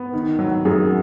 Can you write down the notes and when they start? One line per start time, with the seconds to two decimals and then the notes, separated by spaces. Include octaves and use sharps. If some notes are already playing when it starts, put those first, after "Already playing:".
Already playing: B3
0.14 D#3
0.39 F#3
0.65 F#2 G#4